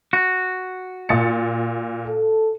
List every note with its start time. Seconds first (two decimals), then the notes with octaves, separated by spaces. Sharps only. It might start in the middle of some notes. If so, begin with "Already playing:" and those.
0.13 F#4
1.09 A#2 A6 C#7
2.05 A4